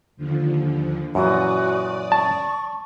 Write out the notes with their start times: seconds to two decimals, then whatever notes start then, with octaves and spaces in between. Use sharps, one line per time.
0.17 D#2 D3 F3
1.15 F#2 A#2 E3 F#4 D5 D#6
2.12 A5 C#6